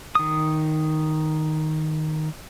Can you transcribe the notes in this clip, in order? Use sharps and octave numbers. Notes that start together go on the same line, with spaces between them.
D#3 D#6